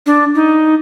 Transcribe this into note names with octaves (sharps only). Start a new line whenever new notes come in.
D4
D#4